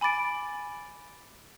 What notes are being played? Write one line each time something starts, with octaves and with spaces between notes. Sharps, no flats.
G#5 B5 D6 A6 D7